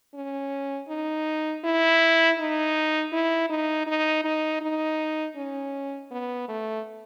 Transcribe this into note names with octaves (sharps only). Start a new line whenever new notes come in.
C#4
D#4
E4
D#4
E4
D#4
D#4
D#4
D#4
C#4
B3
A3